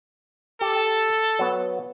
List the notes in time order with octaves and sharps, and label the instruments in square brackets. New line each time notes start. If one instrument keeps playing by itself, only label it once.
[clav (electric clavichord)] G4 [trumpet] A4
[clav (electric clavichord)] F#3 B3